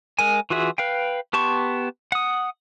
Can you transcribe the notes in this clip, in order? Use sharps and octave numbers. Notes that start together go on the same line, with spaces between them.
G#3 A#4 G#5
E3 F4 F#4 G#4 E5
B4 F5 G5
B3 G4 A5 C6 C#6
F#5 D#6